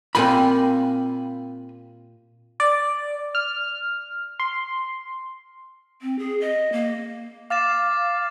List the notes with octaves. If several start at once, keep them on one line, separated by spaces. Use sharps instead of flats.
A#2 C4 F4 G4 G#5 B5
D5
F6
C6
C4
G#4
D#5
A#3
F5 D6 A6 E7